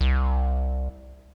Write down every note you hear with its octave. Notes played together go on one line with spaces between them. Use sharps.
C2